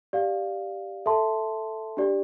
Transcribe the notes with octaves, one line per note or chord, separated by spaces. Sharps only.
G4 D5 F5
A4 E5 A5 C6
D4 G4 D5